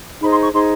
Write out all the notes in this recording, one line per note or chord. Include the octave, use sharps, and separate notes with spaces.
D#4 G#4 C5 B5
C6
C#6
D#4 G#4 C5 C6